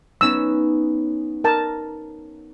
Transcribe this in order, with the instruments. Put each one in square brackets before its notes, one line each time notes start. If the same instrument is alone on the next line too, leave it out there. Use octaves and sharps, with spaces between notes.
[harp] B3 C#4 D#4 [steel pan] E6
[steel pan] A#4 A5